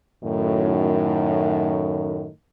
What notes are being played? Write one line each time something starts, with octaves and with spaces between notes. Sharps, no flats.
F#2 A2 D#3